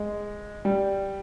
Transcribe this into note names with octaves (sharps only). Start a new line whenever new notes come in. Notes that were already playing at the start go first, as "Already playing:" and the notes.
Already playing: G#3
G3